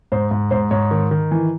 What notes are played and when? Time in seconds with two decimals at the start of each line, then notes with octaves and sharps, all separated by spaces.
0.12 G#2 C5
0.31 G#2
0.51 G#2 C5
0.71 G#2 C#5
0.91 D#3
1.11 D#3
1.31 E3